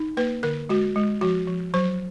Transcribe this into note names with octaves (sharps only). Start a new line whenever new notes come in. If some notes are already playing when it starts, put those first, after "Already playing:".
Already playing: D#4
A#3 B4
D3 A#4
G#3 F#4
G#3
F3 F#4
F3
F#3 C5